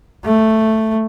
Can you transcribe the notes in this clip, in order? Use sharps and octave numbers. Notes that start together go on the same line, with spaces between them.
A3